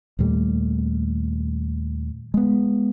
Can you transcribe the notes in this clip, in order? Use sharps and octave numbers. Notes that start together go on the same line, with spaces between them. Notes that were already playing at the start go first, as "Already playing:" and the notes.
D#2 A#2 G3 A3
G#3 B3